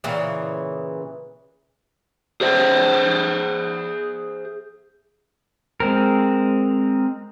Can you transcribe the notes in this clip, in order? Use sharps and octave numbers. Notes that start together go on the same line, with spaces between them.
A#2 C#3 E3
G#4 C5 E5
G#3 C4 A#4